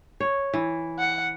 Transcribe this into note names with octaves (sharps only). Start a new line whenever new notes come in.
C#5
E3
F#5